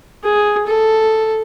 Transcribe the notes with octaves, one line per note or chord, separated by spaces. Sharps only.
G#4
A4